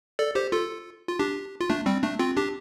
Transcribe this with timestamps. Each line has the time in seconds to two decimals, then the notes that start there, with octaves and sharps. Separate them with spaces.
0.19 A4 D5
0.35 G4 C5
0.52 F4 A4
1.08 F4
1.19 D4 G4
1.61 F4
1.70 A3 D4
1.86 G3 C4
2.03 A3 D4
2.19 C4 F4
2.37 D4 G4